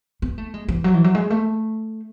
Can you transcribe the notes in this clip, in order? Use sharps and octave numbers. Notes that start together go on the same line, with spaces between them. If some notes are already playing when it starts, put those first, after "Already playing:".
B3
A3
G#3
E3
F#3
E3
F#3
G#3
A3